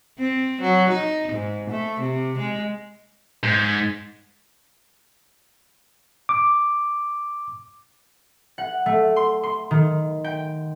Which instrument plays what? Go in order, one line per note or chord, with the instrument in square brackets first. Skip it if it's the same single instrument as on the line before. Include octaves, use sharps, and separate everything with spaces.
[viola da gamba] C4
F#3
D#4
G#2
A3
C3
G#3
[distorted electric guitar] G#2
[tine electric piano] D6
[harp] F#5
A3
C6
C6
D#3
G5